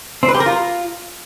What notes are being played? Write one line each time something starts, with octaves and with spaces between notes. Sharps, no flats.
C4
B4
G4
A#4
F4